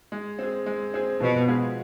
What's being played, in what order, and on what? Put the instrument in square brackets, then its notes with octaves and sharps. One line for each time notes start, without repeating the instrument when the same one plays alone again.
[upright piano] G#3
C4 G#4
G#3
C4 G#4
[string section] B2 [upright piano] F3
[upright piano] G#3 B3 F4 G#4